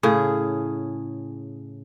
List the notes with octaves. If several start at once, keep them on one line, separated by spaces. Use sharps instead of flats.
A2 C#3 G#4